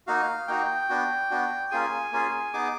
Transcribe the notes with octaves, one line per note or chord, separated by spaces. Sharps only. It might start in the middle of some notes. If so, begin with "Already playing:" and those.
A#3 D#4 F#4 F5
A#3 D#4 F#4 G5
B3 D4 F#4
B3 D4 F#4
A#3 C#4 F4 G#4 G#5
A#3 C#4 F4 G#4
B3 D#4 G#4 D6